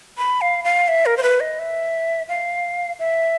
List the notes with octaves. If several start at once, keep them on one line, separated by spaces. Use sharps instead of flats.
B5
F5
F5
E5
A#4
C5
B4
D#5
E5
F5
E5